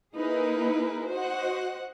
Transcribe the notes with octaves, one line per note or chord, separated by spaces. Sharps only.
A#3 D#4 E4 G#4 A#4 B4
F#4 C5 D#5 F#5